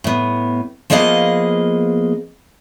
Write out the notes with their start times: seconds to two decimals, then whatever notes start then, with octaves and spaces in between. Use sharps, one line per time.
0.04 A2 B3
0.90 F3 A#3 B3 G#4 D#5 F5